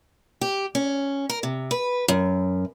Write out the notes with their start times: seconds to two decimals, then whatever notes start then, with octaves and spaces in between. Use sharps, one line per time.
0.41 G4
0.75 C#4
1.29 A#4
1.43 C3
1.71 B4
2.08 F#2